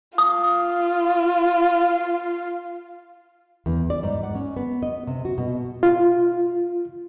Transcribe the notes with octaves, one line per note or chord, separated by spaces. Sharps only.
F4 D#6
E2
D5
G#2
F#5
C#4
B3
D#5
C3
F#4
B2
F4